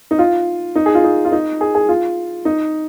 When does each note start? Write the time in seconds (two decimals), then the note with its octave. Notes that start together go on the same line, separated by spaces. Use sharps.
0.11 D#4
0.19 F4
0.75 D#4
0.86 G#4
0.95 F4
1.04 D#4
1.25 F4
1.32 D#4
1.61 G#4
1.75 G#4
1.89 F4
2.45 D#4